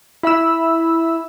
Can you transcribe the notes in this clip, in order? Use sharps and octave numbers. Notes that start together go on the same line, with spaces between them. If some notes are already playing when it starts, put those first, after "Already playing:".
E4 E5 B5 E6